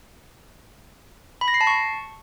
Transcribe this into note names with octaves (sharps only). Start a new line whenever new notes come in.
B5
A#6
C7
A5
C#6